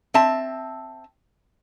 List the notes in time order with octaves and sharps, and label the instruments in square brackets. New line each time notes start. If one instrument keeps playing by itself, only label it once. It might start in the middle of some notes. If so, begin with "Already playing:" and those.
[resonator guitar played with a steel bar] C4 E5 A5